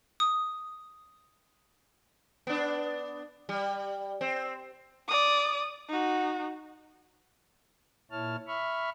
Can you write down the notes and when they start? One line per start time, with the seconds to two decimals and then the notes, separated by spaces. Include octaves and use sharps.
0.20 D#6
2.47 B3 D4
3.49 G3
4.21 C4
5.08 D5 D#6
5.89 D#4 F#4
8.11 A#2 E4 C#5 A5 F6
8.47 E5 B5 C#6 F6